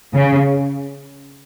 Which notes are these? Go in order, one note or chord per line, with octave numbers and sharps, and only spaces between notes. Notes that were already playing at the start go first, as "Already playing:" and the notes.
C#3